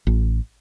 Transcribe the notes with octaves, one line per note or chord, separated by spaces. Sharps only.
A1